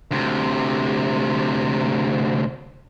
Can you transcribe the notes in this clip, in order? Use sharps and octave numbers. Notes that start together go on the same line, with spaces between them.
D2 C3